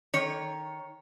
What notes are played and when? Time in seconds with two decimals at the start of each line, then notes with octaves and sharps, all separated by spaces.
0.13 D#3 C#5